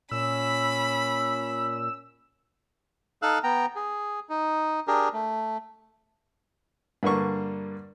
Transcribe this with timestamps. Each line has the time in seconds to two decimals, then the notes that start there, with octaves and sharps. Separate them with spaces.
0.11 A#2 C#4 B5 E6
3.22 D#4 A4 F5 E6 F#6
3.44 B3 G5 A#5
3.76 G#4
4.30 D#4
4.87 D4 G4 G#4 A#4
5.13 A3
7.03 G2 D3 A#3 C#6